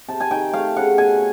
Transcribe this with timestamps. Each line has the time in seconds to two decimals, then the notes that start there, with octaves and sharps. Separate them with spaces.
0.08 C3 A5
0.20 G#5
0.31 D#3 G5
0.53 A3 F5
0.76 C#3 F#5
0.98 B2 G#5